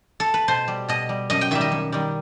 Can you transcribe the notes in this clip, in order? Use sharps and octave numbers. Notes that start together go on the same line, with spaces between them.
A4
B4
B2 C5
G3
B2 D#5
G3
F#2 D#5
G5
D#3 G3 E5
D#5
F#2
D#3 G3